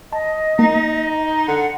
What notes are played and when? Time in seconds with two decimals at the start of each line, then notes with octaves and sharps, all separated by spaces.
0.13 D#5 A5
0.59 A#3 D#4
1.48 D3 F#5